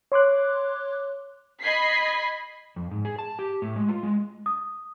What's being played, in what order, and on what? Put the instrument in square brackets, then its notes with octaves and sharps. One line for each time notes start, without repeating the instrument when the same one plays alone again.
[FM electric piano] C#5 C6 D6 F#6
[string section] D#5 B5 G#6 B6 C7
[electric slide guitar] F2
G#2
G#4
A5
G4
A2
G#3
F4
G#3
[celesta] D#6